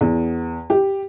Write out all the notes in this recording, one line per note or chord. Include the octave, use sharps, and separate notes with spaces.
E2
G4